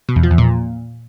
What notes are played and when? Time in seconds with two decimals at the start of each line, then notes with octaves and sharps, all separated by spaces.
0.09 B2
0.16 E2
0.23 F3
0.31 E2
0.38 A#2